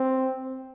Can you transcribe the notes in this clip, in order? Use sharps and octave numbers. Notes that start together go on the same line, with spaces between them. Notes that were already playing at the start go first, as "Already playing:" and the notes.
Already playing: C4